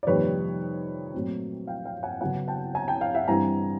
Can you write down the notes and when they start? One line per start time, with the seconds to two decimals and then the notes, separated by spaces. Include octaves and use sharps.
0.03 D5
0.07 F2 C3 D#3 G3 A#3 B4 C#5
1.14 A#2 F#3 A3 C4
1.67 F5 G5
1.85 F5 G5
2.03 F#5 G#5
2.21 C#3 F#3 B3 F#5 G#5
2.48 G5 A5
2.75 G#5 A#5
2.88 G5 A5
3.01 F5 G5
3.15 E5 F#5
3.28 G2 E3 G3 C4 G#5 A#5